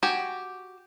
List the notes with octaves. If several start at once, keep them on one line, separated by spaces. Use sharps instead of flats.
F#4 G4 G#5